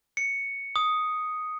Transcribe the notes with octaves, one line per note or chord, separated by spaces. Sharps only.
C#7
D#6